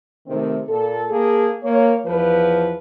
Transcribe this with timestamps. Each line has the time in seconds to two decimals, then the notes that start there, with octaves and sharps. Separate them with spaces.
0.27 C3 D#3 A3 C4
0.68 A#2 A4
1.10 A#3 G#4 A4
1.63 A#3 C#5
2.06 E2 F3 B4